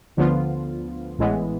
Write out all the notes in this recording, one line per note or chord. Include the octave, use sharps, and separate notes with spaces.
D2 D3 F3 B3 F4
A1 A2 E3 G#3 B3